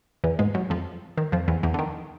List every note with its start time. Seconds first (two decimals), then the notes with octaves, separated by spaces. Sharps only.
0.24 E2 E3
0.39 G#2 G#3
0.54 F#2 F#3
0.70 F2 F3
1.18 D#3
1.32 F2 F3
1.48 E2 E3
1.63 E2 E3
1.74 D3
1.79 D#3